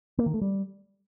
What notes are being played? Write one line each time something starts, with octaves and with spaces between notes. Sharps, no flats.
A#3
D#3
A3
G3